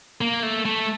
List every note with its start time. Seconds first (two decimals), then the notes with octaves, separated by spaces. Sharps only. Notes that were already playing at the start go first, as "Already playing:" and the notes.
0.21 A#3
0.43 A3
0.65 A3